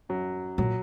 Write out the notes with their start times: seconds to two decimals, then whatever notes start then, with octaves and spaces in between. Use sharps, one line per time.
0.09 F#2 F#3
0.58 A#2 F#3